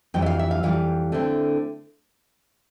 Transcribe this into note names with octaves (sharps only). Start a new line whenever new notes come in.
F2 E3 G3 G5
E5
F5
E5
F5
F2 E3 G3 F5
D3 A3 C4 E4